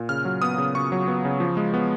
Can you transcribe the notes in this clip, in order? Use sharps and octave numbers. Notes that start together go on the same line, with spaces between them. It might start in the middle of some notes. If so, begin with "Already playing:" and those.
Already playing: A#2
C#3 F6
F#3
B3 D#6
C#3
C#3 C#6
F#3
B3
C#3
F3
G#3
B3